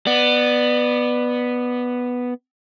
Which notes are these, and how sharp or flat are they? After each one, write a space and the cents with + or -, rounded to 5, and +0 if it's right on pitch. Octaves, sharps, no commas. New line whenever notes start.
B3 +0 D5 +25